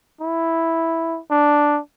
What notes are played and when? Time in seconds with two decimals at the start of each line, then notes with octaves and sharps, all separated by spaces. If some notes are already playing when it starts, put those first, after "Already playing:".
0.21 E4
1.31 D4